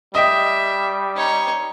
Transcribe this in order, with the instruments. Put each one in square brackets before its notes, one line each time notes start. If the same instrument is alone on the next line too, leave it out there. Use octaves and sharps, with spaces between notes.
[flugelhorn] G3 [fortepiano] D#5 G5 [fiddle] E5
[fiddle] D#4 C#5